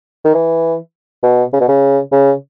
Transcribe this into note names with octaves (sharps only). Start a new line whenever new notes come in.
D#3
E3
B2
C#3
B2
C#3
C#3